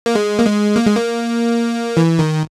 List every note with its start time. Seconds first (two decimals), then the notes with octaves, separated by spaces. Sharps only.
0.06 A#3
0.15 G#3
0.39 A#3
0.45 G#3
0.76 A#3
0.86 G#3
0.97 A#3
1.97 E3
2.19 D#3